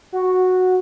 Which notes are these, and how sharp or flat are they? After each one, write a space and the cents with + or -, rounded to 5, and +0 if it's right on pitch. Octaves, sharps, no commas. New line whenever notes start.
F#4 -5